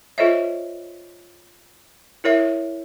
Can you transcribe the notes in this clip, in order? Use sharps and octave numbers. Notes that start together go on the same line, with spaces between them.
F4 A4 C5 C#5 D#5 E5
E4 A#4 C#5 E5